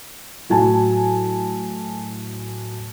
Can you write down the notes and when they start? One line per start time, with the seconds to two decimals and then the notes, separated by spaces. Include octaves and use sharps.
0.49 A2 F#3 G#5 A5